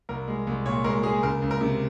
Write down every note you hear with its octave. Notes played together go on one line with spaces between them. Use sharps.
C2 A#4
G#3
C2
A#2 C#5
G#3 A#4
G#3 G#4
C#2 A#4
C#2
A#4
C3